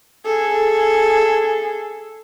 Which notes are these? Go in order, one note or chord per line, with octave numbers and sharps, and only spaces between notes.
G#4 A4